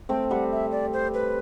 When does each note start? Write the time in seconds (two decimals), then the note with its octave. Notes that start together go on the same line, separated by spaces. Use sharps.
0.09 A3 C4 G5
0.30 G3 F#5
0.51 E5
0.72 D5
0.93 C5
1.14 B4